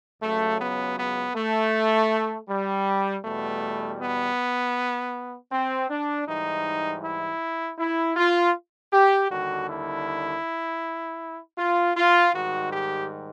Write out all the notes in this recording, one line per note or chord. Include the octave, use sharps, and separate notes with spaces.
C#2 C#3 F#3 A3
B3
B3
A3
G3
E2 B2 G3 A3
B3
C4
D4
G#2 E3 G3 D#4
E4
E4
F4
G4
D#2 D3 G3 F#4
E4
F4
F4
G#2 D#3 G3 F#4
G4